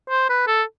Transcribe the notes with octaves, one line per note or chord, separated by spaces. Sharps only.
C5
B4
A4